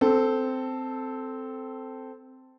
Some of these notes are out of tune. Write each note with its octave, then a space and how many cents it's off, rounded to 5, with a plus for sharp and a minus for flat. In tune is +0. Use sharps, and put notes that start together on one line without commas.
C4 -10 A4 +0